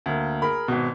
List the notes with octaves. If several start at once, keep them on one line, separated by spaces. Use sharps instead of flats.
D2 A#3
G#4 A#4 B5
G#1 B2